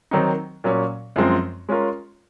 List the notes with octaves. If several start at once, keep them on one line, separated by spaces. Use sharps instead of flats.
D#3 F#3 C4 D#4
A#2 F#3 C#4
F#2 F3 G#3 C4 F4
G#3 C#4 F4 A#4